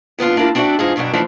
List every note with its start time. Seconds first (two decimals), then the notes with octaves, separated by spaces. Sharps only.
0.19 D#2 B3 D4 F4
0.36 A#3 D4 E4 F4 A#4
0.55 C4 D4 F#4 C#5 D5 E5
0.79 E2 G#2 D#4 F4 G#4
0.96 G2 B2 D3 F#3 D4
1.13 E3 F3 A3 A#3 D4 D#4